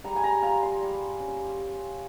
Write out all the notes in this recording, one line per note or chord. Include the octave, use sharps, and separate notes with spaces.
G3 A#5
G#5
A#5
F4 A#5
C6
G3
C#4